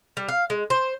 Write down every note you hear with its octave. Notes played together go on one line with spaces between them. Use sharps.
G3
F5
G#3
C5